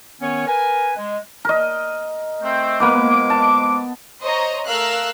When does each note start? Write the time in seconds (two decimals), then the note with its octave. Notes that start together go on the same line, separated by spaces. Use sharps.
0.21 D#3 B3 C#4 C#5
0.47 A#4 B4 G#5
0.97 G#3
1.45 A#4 D#5
2.42 A3 C4
2.80 F3 G#3 A#3 B3 B4 D6
3.30 A5
4.22 C5 C#5 D#5 A#5
4.68 A3 A#4 F5 E6 F#6